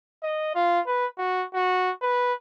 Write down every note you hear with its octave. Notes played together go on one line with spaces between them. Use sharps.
D#5
F4
B4
F#4
F#4
B4